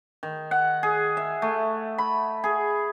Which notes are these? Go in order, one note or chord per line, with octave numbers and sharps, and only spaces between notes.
D#3
F#5
G#4
E5
A3
B5
G#4